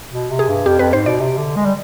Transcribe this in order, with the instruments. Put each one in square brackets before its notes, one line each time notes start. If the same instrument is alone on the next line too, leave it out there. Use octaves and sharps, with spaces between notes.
[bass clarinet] B2
C3
[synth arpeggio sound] G#4
[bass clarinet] G2
[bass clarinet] F2 [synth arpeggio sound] G4
[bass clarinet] F2 [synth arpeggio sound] B4
[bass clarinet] G#2 [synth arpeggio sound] C5
[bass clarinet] B2 [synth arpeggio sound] D5
[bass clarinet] C3
D3
G#3
G3